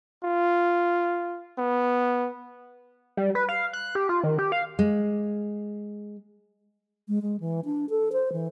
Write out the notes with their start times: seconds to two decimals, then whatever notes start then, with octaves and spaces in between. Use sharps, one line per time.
0.23 F4
1.58 B3
3.17 G3
3.35 B4
3.49 F5
3.73 F#6
3.95 G4
4.09 F4
4.24 D#3
4.39 G4
4.52 F5
4.79 G#3
7.08 G#3
7.22 G#3
7.40 E3
7.65 D4
7.90 A4
8.12 C5
8.32 E3